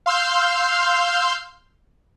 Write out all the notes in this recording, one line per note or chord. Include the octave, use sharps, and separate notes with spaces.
F5 C6 E6 F6 G6